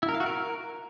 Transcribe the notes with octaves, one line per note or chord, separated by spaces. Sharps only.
E4
A#4
F5
F#4
A#4